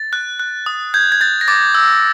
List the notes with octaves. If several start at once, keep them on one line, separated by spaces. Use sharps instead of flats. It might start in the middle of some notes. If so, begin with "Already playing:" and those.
Already playing: A6
F#6
F#6
D#6
G6 G#6
G#6
G6 A6
A#6
D6 A6
E6